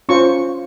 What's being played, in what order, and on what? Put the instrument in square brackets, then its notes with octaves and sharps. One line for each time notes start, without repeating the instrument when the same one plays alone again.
[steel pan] C#4 F4 C5 C#6